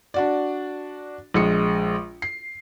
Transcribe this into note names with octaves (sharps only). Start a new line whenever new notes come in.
D4 F#4 D5
A#1 G#3 C#7
C7